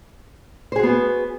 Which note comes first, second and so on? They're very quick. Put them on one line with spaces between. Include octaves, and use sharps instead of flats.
C5 G#4 F#4 B3